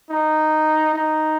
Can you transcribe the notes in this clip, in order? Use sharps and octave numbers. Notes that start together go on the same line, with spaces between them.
D#4
D#4